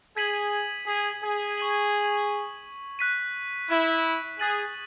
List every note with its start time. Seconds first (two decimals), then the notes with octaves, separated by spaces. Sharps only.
0.17 G#4 G#6 B6 D#7 F#7
0.87 G#4
1.22 G#4
1.58 C#6 G#6 D#7 F#7
2.99 F#6 B6 D#7
3.69 E4
4.39 G#4 D#6 F#6 A6 D#7 F#7